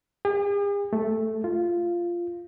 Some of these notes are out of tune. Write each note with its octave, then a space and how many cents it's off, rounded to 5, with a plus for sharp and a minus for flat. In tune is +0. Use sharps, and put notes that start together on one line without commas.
G#4 -45
A3 +0
F4 -10